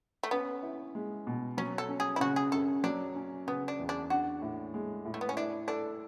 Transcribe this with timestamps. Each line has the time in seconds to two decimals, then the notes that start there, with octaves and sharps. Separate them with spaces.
0.23 A3
0.31 B3 C#4
0.63 E4
0.95 G#3
1.27 B2
1.57 F#3 C#4
1.78 A4
1.89 C#4
2.00 G#4
2.16 E4
2.20 C#3 F#4
2.36 G#4
2.52 F#2 A4
2.83 F#3 D4
3.16 C#4
3.47 C#3 B3
3.68 D4
3.79 E2
3.89 D4
4.10 D4 F#4
4.42 A2
4.74 G#3
5.05 A2
5.14 A3
5.21 B3
5.29 C#4
5.36 D4 E4
5.68 D4 A4